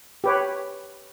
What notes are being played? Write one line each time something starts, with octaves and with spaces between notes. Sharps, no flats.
G4 B4 C#5